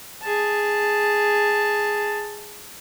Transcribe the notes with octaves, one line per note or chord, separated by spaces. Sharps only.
G#4 A5